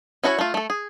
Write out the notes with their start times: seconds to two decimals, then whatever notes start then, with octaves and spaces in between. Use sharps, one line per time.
0.24 C#4 E4 F#4 B4 C#5
0.39 A3 F4
0.54 A3 A4
0.70 G#4